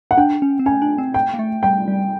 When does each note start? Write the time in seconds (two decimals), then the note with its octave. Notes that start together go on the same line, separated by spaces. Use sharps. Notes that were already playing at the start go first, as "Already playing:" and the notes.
0.11 F#5
0.18 D4 G5
0.42 C#4
0.59 C4
0.66 C#4 G#5
0.82 D4
0.98 C4
1.14 G5
1.34 A#3
1.39 A3
1.63 G3 G5
1.88 G3